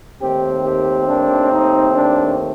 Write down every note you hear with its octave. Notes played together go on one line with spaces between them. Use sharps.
D#2 D#3 A3 C4 G4
G4
D4
D#4
D4